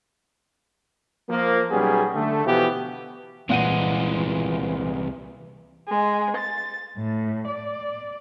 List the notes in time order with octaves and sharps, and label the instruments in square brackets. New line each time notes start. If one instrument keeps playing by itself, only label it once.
[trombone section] F3 A#3
B1 G3 B3 C#4 G#4
D3 A3
B2 E3 F3 B3 G4
[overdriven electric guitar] C2 G#3 [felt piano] A#2 F#5 D#7 [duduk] E3
[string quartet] G#3
A6
A2
D5